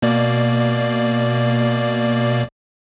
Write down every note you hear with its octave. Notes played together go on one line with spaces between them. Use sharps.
B2 A#3 D5